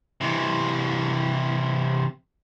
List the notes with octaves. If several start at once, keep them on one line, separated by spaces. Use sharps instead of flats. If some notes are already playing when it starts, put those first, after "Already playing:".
C3 E3